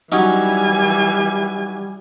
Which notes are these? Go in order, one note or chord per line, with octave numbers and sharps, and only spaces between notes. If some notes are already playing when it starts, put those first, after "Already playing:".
E3 F#3 G3 C#4 D#4 G#5